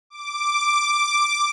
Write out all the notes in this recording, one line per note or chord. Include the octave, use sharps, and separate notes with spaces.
D6